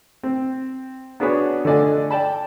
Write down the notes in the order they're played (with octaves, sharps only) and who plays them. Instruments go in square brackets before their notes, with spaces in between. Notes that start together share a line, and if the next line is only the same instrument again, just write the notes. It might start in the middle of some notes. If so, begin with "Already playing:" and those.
[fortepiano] C4
B3 D4 F#4 G#4 B4 C#5
D3 A3 F4 D5 D#5 G#5
D5 G5 A5 B5